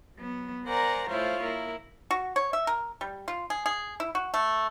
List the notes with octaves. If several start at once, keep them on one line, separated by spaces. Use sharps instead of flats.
F#3 B3
A#4 C5 D5 F#5 G#5 A#5
A3 E4 F4 C5 C#5 F5
A#3 E4 A#4
F#4
C#5
E5
A#4
G3
F4
G#4
G#4
E4
F#4
A3